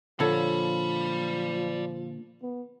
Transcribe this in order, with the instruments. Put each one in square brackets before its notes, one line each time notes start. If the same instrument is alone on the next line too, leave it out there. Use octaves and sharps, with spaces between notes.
[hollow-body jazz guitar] A#2 D3 [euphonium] F3 [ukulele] A4 C#5 A5 [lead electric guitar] D5 B5
[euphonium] B3